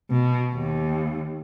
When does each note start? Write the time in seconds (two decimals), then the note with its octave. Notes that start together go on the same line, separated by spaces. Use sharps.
0.11 B2
0.55 D#2